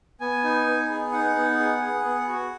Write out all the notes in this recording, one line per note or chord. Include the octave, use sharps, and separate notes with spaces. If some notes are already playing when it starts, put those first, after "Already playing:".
B3 G#5
D#4
B3
G#4
D#4 F#5
B3
G#4
G#4
B3
F#4